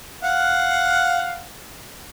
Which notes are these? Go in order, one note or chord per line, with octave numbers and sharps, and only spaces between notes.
F5 F#5